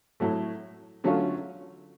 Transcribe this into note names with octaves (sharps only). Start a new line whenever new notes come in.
A2 F#3 A3
D3 F#3 A3 C#4 F4